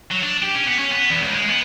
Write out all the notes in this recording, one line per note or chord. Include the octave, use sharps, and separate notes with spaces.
F#3
D4
G4
C#4
B3
C#4
B3
E2
C#2
G#3
B3